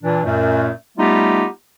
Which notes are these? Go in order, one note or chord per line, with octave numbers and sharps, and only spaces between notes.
A#2 E3 D4
F#2 A#2 A3
G3 A3 B3 D#4 F4 G4